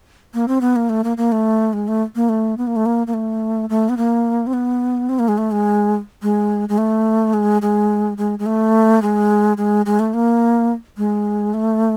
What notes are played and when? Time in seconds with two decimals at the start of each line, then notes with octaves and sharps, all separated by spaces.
0.34 A#3
0.48 C4
0.61 B3
0.76 A#3
0.89 A3
1.04 A#3
1.17 A#3
1.32 A3
1.73 G#3
1.88 A3
2.16 A#3
2.29 A3
2.58 B3
2.67 A#3
2.76 A3
2.86 A#3
3.07 A#3
3.14 A3
3.70 A3
3.89 B3
3.97 A#3
4.47 C4
4.53 B3
5.09 C4
5.19 A#3
5.28 G#3
5.38 A3
5.51 G#3
6.22 G#3
6.69 G#3
6.78 A3
7.34 G#3
7.62 G#3
8.18 G#3
8.39 G#3
8.46 A3
9.02 G#3
9.57 G#3
9.86 G#3
9.99 A3
10.14 A#3
10.97 G#3
11.54 A3